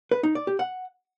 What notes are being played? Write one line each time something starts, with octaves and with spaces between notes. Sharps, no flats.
B4
D#4
D5
G4
F#5